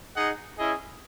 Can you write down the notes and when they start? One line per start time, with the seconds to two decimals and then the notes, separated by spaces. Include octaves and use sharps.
0.16 D#4 G#4 D#5 F#5
0.58 C#4 E4 G#4 D#5